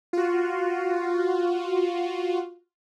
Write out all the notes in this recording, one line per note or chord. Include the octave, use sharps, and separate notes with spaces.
F4 F#4